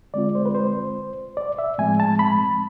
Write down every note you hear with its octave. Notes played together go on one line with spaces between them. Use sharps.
D3 G#3 C4 F4 D5
C5
B4
C5
D5
E5
A2 F3 G#3 C4 G#5
A5
B5